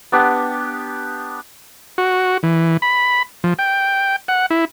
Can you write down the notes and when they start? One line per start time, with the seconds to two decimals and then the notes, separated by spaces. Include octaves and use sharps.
0.12 B3 D4 G4
1.98 F#4
2.43 E3
2.82 B5
3.44 F3
3.59 G5
4.28 F#5
4.50 E4